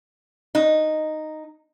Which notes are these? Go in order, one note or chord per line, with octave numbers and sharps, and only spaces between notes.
D#4